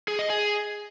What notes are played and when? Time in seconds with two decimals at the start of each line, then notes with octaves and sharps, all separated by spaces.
0.08 G#4
0.19 D#5
0.30 G#4